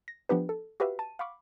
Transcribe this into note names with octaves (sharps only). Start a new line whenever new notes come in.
A#6
F3 B3 D4 G4 B4
A4
F#4 G4 B4 E5 F5
A5 D#7
F5 F#5 B5 C#6 D6